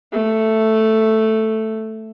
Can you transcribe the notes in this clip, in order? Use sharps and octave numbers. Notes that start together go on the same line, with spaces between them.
A3